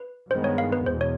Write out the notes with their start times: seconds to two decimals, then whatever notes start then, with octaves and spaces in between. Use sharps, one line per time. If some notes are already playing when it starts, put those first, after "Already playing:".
Already playing: B4
0.30 G2 D#3 G#3 B3 C5
0.44 C#5
0.58 F5
0.72 B4
0.86 E2 B2 C5
1.01 C#5